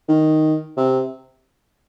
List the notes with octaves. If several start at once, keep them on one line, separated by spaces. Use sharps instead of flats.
D#3
C3